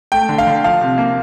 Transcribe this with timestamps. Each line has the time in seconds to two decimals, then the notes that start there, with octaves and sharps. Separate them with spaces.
0.12 A3 G5
0.29 D3
0.38 F5
0.47 D3
0.64 F3 F5
0.81 C3
0.98 A#3